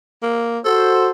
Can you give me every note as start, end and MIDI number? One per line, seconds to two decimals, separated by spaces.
0.22 0.59 58
0.65 1.11 66
0.65 1.09 69
0.65 1.11 72